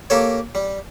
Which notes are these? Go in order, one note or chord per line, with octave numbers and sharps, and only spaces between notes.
A#3 G4 A4 C#5
G3